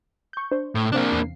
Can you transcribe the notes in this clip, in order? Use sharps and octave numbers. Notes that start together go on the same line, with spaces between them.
C#6 G6
D4 C5
A2
C3 A#3 C4 D4 F5
E2 C7